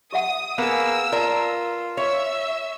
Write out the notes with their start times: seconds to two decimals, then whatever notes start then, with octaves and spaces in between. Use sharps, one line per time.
0.12 G4 E5 F#5 D#6
0.58 A#3 B3 G#4 E6
1.12 F4 A#4 D5 A5
1.97 C#5 E5 E6